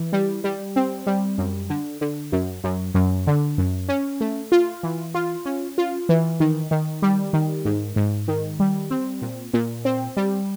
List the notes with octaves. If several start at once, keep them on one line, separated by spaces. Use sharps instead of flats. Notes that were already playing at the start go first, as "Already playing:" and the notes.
Already playing: E3
G3
G3
C4
G3
F#2
D3
D3
F#2
F#2
F#2
D3
F#2
C#4
A3
F4
E3
F4
C#4
F4
E3
D#3
D#3
G3
D#3
G#2
G#2
D#3
G3
C4
A#2
A#2
C4
G3